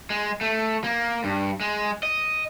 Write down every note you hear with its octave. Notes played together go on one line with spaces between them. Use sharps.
G#3
A3
A#3
G2
G#3
D#5